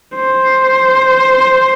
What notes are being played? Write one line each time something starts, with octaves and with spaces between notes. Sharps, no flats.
C5